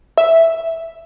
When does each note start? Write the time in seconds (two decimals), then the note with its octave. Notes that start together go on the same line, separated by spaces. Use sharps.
0.18 E5